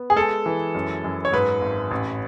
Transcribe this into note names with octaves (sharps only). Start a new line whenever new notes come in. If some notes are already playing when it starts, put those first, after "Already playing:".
Already playing: B3
G#4
G#3 A4
E3
F#2
F#2
C#5
G#2 B4
G#1
A1